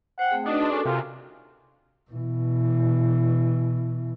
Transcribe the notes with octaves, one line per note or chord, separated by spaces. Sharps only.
C5 F#5 G5
A3 C4 G#4
D4 D#4 F#4 B4 D#5
G#4 C6 D6
C#4 F#4 A4 A#4
C3 F4 G#5 A#5
B2 E3